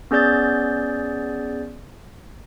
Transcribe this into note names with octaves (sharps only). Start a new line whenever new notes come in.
B3 C#4 G#4 D5 G6 A6